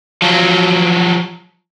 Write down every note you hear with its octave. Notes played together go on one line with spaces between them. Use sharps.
F3 F#3